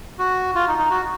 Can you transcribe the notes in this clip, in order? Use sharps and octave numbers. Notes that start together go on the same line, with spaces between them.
F#4
F4
D#4
D#4
F#4